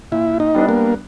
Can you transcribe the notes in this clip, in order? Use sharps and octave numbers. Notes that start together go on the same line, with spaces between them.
A#2 E4
D#4
G3 B3 D4
A#3